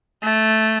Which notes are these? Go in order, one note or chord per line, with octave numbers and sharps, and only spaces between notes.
A3